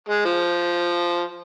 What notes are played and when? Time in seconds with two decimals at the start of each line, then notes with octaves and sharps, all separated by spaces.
0.09 G#3
0.25 F3